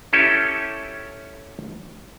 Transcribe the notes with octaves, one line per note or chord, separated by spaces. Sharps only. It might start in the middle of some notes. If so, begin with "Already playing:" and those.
C#4 E4 G4 A4